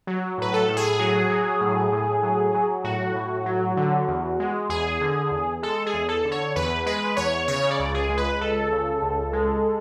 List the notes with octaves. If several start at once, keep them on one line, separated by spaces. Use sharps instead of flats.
F#3
A2 B4
A4
A2
G#4
F#3
F#3
A2
A2
F#3
F#3
A2 F#4
A2
F#3
D3
E2
G#3
E2 G#4
D3
E2
G#3 A4
G#4
E2
A4
D3
C#5
E2 B4
G#3 B4
E2 C#5
C#3 C#5
D5
C#2
G#4
G#3
B4
C#2 A4
C#3
C#2
G#3